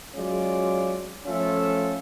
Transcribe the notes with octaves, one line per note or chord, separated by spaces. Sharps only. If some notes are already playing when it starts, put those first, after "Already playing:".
F#3 G#3 C#4 F4 D5
F3 A3 C#4 F4 A4 E5